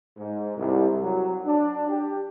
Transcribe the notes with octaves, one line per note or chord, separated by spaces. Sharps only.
G#2
C2
F#3
D4
G4